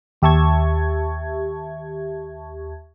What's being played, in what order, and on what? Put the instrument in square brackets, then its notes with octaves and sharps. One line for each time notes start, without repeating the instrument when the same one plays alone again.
[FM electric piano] D#2 G4 E5 A5 C#6 G#6